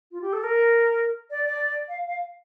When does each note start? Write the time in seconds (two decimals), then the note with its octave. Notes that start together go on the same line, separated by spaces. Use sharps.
0.11 F4
0.21 G4
0.33 A4
0.43 A#4
1.30 D5
1.44 D5
1.88 F5
2.06 F5